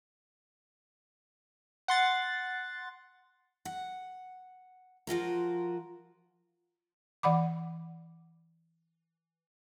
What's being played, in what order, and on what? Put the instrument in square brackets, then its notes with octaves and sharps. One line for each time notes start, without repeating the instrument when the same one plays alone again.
[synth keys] F#5 C6 A6
[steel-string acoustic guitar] F#5
F3 F4 F#4 A#4
[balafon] E3 D5 F#5 B5 D6